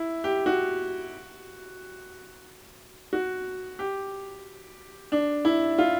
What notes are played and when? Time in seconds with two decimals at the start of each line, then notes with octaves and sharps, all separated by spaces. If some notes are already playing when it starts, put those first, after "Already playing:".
Already playing: E4
0.24 G4
0.46 F#4
3.13 F#4
3.79 G4
5.12 D4
5.45 E4
5.79 F4